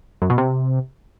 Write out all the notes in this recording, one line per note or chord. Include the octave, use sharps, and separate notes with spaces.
F#2
B2
C3